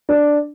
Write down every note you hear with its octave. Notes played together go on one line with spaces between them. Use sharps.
D4